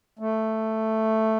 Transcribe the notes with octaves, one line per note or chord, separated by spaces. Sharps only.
A3